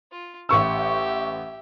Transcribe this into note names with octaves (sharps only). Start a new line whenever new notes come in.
F4
A1 G4 E5 C#6 E6